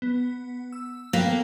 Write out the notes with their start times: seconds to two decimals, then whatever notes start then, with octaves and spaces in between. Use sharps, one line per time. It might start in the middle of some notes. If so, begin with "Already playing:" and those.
0.02 B3
0.72 E6
1.13 A#3 B3 A4 G5